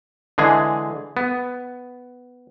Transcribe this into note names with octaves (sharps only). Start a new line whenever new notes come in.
D3 E3 G#3 G#4
B3